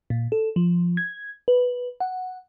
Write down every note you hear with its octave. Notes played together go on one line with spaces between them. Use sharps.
A#2
A4
F3
G#6
B4
F#5